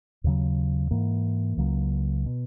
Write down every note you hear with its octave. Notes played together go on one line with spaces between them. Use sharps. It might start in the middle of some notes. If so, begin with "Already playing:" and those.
D#2 C#3 F#3
G#2 E3 A#3
C#2 C#3 F#3 A#3
B2